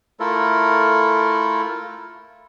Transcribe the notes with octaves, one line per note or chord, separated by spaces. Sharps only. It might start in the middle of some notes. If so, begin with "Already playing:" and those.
A3 E4 F4 A4 A#4